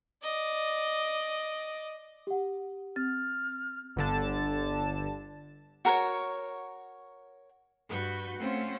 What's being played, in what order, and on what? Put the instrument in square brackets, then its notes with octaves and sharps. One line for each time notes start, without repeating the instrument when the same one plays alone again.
[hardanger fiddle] D5 D#5
[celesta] G4 F#5
[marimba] C4 [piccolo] F6 [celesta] A6
[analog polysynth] G1 D3 A5
[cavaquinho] F#4 A#4 B4 C#5
[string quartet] G2 F#4 B4 C#6 G6
A3 C4 C#4 F4 C5 F#5